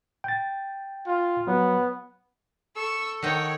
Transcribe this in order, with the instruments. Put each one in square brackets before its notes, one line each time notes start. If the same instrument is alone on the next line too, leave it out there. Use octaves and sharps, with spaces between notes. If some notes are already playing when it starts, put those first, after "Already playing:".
[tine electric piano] G5 A6
[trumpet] F4
[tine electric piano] F#3 [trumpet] B3
[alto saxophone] A4 [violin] C#6 E6
[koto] D#3 F#5 G5 [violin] C#5